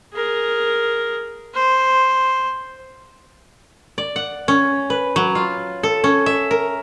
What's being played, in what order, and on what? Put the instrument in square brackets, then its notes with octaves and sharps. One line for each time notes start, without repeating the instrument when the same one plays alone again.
[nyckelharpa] G#4 A#4
C5
[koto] D5
F#5
C#4
B4
F#3
F4
A4
C#4
E5
A#4